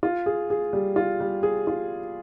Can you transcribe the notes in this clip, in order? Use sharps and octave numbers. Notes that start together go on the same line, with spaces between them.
F4
G#4
G#4
G3
F4
G3
G#4
F4